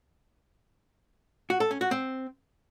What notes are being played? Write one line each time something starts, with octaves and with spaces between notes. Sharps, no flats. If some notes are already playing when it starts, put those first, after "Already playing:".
F#4
A4
C#4
F#4
C4